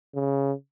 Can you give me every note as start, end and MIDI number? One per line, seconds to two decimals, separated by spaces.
0.15 0.52 49